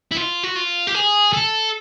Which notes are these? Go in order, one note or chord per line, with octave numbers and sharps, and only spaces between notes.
E4
F4
F#4
F4
G4
G#4
A4